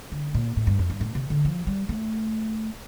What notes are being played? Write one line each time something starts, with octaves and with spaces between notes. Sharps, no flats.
D3
A#2
A2
G2
F2
G2
A2
C3
D3
F3
G3
A3